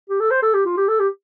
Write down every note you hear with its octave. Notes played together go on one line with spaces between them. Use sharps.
G4
A4
C5
A4
G4
F4
G4
A4
G4